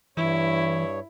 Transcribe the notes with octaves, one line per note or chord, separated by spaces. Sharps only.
G2 E3 E4 C#5